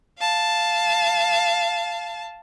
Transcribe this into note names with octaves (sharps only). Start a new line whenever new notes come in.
F5 A5